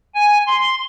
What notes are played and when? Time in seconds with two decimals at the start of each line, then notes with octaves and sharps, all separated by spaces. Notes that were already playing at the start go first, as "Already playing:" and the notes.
0.15 G#5
0.47 C6